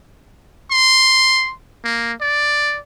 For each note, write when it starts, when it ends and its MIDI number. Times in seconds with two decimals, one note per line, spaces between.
0.71 1.53 84
1.84 2.13 58
2.21 2.78 74